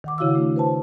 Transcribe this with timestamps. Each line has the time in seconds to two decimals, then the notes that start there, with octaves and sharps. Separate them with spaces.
0.04 D#3 F#5 D6
0.18 C#3 E4 F#4 F5 D6 E6
0.35 A3 D4
0.56 B4 C5 A5